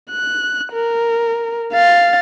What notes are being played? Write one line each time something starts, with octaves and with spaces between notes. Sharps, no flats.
F#6
A#4
F5 A6